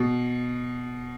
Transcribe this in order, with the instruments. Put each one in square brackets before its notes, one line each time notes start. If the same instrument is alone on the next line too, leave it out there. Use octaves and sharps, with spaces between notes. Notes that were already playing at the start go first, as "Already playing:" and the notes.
Already playing: [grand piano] B2